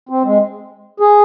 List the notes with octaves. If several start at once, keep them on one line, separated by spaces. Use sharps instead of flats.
C4
G#3
G#4